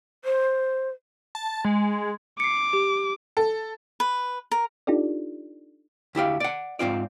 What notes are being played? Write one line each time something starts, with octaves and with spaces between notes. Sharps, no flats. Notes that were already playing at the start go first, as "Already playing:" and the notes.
C5
A5
G#3
D6 C7 C#7
G4
A4
B4
A#4
D4 D#4 F4 G4 A4 D5
D2 E4 G4 F5
D5 F#5
G#2 C4 F4 D5